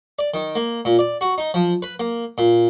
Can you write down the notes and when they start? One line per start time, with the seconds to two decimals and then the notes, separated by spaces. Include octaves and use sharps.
0.19 D5
0.34 D#3
0.56 A#3
0.85 A#2
0.99 D5
1.21 F#4
1.38 D#4
1.54 F3
1.82 B4
2.00 A#3
2.38 A#2